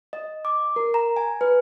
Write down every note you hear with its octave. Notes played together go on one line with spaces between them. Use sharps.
D#5
D6
A#4
A#5
G#5
B4